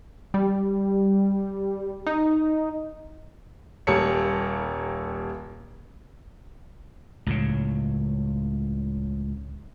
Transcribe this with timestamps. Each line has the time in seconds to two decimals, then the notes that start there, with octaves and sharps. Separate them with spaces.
0.34 G3
2.07 D#4
3.87 D#1 G3 A#3 A4 C#5 C#7
7.27 C#2 A2 C#3